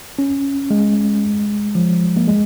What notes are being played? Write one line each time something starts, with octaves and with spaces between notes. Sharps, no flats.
C#4
G#3
F3
A#3
G#3